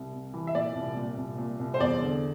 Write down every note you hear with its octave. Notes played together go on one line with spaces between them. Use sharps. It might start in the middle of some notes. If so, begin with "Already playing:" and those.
Already playing: C2
C3
E3
E5
A#2 D5
C2
A#2
C2
A#2
C2
C5
E2 D5
D3